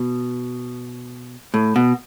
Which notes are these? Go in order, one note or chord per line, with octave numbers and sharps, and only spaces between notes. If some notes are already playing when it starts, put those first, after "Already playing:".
Already playing: B2
A2
B2